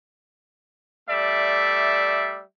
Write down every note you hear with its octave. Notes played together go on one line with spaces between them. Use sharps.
G3 A3 D5 E5